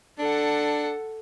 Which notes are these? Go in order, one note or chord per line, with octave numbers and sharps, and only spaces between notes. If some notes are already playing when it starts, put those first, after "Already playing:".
D4 A4 F#5